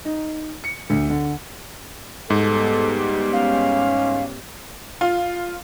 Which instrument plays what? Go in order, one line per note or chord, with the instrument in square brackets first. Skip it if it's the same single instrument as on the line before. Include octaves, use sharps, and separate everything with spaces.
[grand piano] D#4
C#7
D2
D3
[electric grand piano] G#2 [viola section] G3 B3 [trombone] A4
[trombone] C#4 [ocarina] F5
[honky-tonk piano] F4